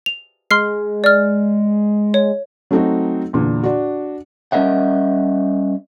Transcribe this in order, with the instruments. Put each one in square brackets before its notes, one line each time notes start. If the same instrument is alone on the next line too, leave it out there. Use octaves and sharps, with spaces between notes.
[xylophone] F7
[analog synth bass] G#3 [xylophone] C6 F6 C7
[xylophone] D5 F6
C#5
[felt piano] F#3 A3 C4 D#4 F#4
E2 A#2 D3
D4 F#4
[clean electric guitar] G3 C#4 A#4 D#5 E5 F#5